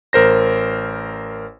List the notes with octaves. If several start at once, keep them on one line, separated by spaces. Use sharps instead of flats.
A1 A#4 C5 A#6